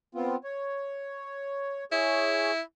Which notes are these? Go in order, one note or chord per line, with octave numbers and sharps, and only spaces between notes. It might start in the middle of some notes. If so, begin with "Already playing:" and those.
B3 C4 F4
C#5
E4 G#4 C#5